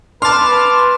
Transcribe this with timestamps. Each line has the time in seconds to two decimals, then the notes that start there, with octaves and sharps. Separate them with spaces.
0.22 B4 A5 C6 D6 F6